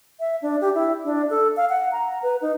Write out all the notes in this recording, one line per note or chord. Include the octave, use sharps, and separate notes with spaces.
E5
D4
G4
E4
D4
A4
F5
F#5
A#5
B4
D#4